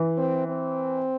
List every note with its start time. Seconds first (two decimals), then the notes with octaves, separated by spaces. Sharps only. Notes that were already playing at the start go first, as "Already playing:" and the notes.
Already playing: E3
0.18 C4
0.49 C4